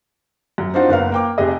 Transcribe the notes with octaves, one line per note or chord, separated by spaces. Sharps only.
F#2
C4 D4 D#4 F4 F#4 C5
F#1 B3 A#4 F5
A#3 G5 D6
F1 C3 G4 G#4 D#5